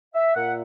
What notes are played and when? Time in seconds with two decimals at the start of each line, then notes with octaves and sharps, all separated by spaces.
0.14 E5
0.35 A#2 F#5